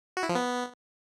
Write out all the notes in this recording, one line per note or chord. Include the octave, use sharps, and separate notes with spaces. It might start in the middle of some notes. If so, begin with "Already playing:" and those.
F#4
E4
F3
B3